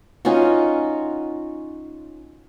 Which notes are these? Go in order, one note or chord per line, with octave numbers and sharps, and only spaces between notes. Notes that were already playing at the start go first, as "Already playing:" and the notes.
C#4 D#4 F4 F#4